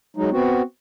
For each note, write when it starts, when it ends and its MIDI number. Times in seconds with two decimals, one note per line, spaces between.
0.17 0.30 54
0.17 0.30 56
0.17 0.30 63
0.31 0.62 59
0.31 0.62 60
0.31 0.62 66